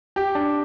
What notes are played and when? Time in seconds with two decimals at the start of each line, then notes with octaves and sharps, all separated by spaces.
0.16 G4
0.35 D4